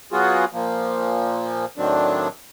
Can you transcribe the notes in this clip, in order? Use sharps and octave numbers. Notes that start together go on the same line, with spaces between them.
F#3 B3 F4 F#4 G#4
A#2 F3 A#3
A2 D#3 F#3 C4 D4